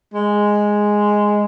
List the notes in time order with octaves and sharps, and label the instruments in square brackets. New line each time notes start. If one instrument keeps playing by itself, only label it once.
[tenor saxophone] G#3